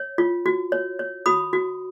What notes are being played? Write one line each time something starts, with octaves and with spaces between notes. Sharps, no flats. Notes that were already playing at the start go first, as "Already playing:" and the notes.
Already playing: C#5
F4
F#4
C#5
C#5
F#4 B5 D#6
F#4